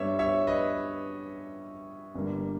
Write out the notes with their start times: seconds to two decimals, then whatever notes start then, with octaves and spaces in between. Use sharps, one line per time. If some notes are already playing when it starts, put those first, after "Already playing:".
Already playing: G2 G3 B3 C#5 E5
0.19 C#5 E5
0.47 B4 D#5
2.15 G1 G2 G3 A#3